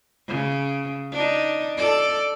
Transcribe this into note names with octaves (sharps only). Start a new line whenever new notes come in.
C#3
D4 D#4
A4 D5